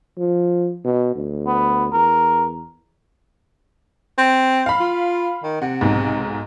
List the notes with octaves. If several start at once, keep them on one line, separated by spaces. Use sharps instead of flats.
F3
B2
D2
B3
E2 A#4
C4
F5 B5
F4
D#3
C3 F#5
B1 G#2